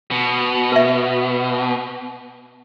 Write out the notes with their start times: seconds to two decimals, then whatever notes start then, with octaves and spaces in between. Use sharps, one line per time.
0.11 B2
0.72 B4 E5